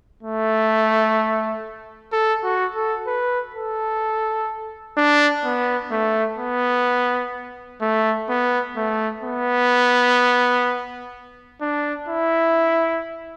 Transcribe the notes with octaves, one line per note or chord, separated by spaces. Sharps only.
A3
A4
F#4
A4
B4
A4
D4
B3
A3
B3
A3
B3
A3
B3
D4
E4